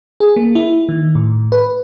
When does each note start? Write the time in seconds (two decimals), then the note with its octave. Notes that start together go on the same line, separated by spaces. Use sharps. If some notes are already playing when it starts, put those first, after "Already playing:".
0.20 G#4
0.36 A#3
0.55 E4
0.89 D#3
1.15 A2
1.52 B4